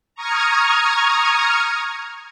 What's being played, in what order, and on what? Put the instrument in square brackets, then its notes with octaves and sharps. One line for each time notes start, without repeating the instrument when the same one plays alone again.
[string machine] A#5 C#6 D#6 F6 G#6